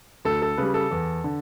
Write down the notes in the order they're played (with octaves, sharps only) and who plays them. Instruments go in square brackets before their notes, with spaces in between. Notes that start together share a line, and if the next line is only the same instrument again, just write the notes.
[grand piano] D2 A4
A4
C#3 G3 B4
A4
E2
D3